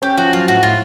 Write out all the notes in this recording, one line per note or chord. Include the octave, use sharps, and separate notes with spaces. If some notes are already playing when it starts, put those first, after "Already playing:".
C#4 G4
F3 F#4
F#3 F4
A2 F#4
A2 F4